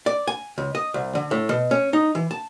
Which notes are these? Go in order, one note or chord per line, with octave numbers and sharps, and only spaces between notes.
D5
G#5
C#2
D#5
C2
D3
A2
B2
C#4
D#4
E3
A5